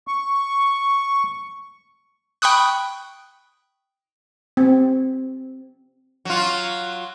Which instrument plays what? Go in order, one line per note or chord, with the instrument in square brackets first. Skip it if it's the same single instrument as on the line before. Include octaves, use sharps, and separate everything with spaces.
[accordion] C#6
[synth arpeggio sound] G5 B5 C#6 D#6 F#6
[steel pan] C4
[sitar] F#3 F4